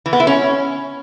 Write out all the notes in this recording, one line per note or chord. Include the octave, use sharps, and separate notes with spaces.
E3
B3
E4
C#4